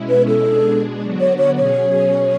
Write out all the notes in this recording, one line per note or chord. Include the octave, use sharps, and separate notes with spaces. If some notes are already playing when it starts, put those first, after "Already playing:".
Already playing: B2 G#3 C#4 E4
B4
A4
B2 G#3 D4 G#4
D3 F#3 B3 D4 F#4
C#5
C#5
B2 F#3 C#4 G#4 C#5